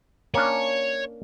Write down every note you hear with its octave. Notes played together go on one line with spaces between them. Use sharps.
A#3 C#4 D4 C#5